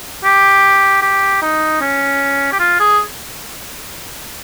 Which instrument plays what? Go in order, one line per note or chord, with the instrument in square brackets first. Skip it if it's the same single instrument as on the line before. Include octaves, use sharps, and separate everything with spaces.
[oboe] G4
G4
D#4
C#4
G4
F4
G#4